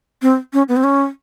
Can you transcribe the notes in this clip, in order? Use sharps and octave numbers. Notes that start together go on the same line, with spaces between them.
C4
C#4
B3
C4
C#4